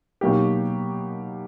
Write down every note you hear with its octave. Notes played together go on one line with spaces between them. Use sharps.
B2 F#3 A#3 D#4 G4